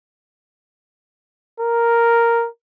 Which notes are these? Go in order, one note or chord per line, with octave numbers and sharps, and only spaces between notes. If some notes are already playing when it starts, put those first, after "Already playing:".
A#4